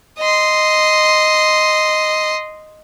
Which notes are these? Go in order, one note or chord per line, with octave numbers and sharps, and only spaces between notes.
D#5 C6